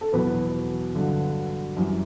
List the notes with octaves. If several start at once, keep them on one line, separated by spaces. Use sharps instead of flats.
A4
E2 B2 F#3 B4
G2 D3 F#3
F#2 E3 G3